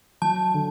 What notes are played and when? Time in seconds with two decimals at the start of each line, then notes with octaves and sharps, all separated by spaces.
0.22 F#3 A5
0.54 D3